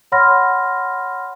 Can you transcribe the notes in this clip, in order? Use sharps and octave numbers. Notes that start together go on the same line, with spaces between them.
C#5 F#5 B5 C6 F6 A#6